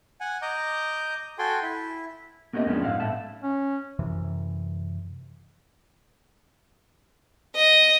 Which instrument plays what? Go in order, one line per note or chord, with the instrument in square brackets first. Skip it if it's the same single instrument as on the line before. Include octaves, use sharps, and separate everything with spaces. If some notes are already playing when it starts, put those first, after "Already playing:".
[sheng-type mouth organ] F#5 G#5
D#5 A#5 D6 G6
F#4 A4 G5 G#5 C6
E4
[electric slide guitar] A#3 B3 C#4 G4 D#5
F2 G#3 B3 C#4 D4
G#2 F5 F#5
A2 A3 E5 A5
[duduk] C#4
[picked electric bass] F#2 C3 E3
[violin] D#5